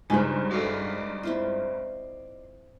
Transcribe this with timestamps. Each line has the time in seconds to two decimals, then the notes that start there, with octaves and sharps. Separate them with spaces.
0.10 C#2 G2 C#3 G#3 D#4 C5 G#5 A#5
0.51 F#4 A4 D5 D#5 F5
1.23 C4 E4 F4